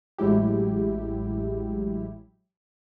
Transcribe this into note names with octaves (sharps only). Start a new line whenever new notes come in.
A1 F#3 G#3 E4 G4